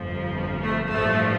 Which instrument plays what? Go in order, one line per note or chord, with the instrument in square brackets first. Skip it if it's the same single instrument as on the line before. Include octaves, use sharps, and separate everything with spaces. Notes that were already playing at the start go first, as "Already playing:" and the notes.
Already playing: [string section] G1 F2 F3
A3
A1 G2 F3 A3